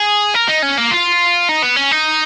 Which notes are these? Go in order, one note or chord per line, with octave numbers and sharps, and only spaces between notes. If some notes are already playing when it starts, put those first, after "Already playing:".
Already playing: G#4
A#4
D#4
C#4
A#3
F4
D#4
B3
C#4
D#4